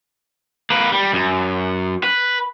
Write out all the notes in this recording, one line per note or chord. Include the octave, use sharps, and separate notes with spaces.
A#3 B4
G3
F#2
B4